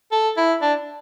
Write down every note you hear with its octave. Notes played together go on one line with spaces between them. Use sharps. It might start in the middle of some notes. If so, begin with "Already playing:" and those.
A4
E4
D4